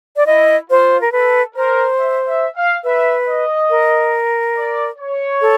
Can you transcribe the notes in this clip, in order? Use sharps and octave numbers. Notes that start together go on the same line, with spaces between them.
D5
E4 D#5
F4 C5
A#4
A4 B4
A#4 C5
E5
E5
F5
B4 E5
D#5
A#4
D5
C#5
A4